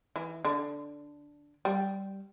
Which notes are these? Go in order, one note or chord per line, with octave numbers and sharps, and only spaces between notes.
E3
D3
G3